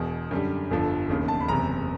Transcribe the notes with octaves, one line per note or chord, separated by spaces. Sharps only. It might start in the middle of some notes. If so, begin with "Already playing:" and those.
Already playing: E1 E2 B2
F#2 D3 G3
G1 F2 D3 F3
E1 D#2 C#3
A5
B5
F#1 E2 C3 A#5